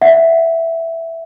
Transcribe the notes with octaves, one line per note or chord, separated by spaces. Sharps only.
E5 F#5